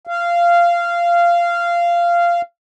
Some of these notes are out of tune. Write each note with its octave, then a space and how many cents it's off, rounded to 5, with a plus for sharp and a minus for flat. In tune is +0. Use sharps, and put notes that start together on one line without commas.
F5 -15